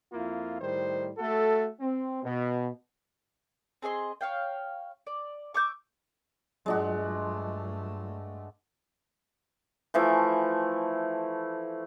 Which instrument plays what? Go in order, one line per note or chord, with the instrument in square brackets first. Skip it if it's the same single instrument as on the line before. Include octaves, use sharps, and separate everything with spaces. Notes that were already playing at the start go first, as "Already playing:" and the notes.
[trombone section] F2 A#3 E4 F4
A2 D#3 G3 C5
A3 F#4 A4
C4
B2
[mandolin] C4 G#4 D#5 C6
C#5 F5 G5
D5
C#6 D6 E6 G6
[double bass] G2 A3 [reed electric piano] F#3 F4 D#5 [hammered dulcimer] G#3 D4 F#4
[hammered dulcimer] E3 F3 A3 E4